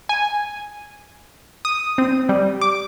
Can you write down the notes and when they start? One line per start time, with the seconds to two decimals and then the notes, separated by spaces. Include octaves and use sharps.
0.09 G#5
1.65 D#6
1.98 C4
2.29 G3
2.61 D6